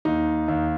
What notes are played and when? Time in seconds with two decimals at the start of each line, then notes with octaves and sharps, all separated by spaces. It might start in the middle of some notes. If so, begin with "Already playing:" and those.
0.05 D#2 D#4
0.48 D#2